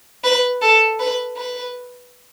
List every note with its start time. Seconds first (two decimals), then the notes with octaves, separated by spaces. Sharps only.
0.24 B4
0.62 A4
0.99 B4
1.37 B4